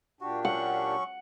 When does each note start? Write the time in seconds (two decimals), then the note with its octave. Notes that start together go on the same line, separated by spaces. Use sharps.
0.21 A#2 D4 F#4 G4
0.45 F#3 C#4 F#5 C#6